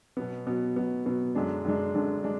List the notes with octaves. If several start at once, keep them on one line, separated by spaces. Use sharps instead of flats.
B2 F#3 B3
B2 F#3 B3
B2 F#3 B3
B2 F#3 B3
F#2 D3 G#3 D4
F#2 D3 G#3 D4
F#2 D3 G#3 D4
G#3 D4